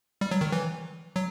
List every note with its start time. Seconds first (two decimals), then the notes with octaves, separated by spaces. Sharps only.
0.21 G3
0.31 F#3
0.41 D#3
0.52 E3
1.16 F#3